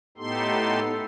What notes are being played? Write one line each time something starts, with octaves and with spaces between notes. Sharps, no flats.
A2 B3 D#4 G4 A4 C6